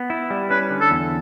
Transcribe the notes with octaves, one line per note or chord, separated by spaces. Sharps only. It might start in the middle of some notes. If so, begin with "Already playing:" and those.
Already playing: B3
E4
G3
C#4 B4
D3
A4
E2